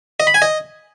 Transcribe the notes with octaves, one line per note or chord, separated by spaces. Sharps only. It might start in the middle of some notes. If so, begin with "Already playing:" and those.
D#5
B5
G#5
D#5